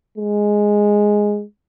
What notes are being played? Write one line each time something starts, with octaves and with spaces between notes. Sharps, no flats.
G#3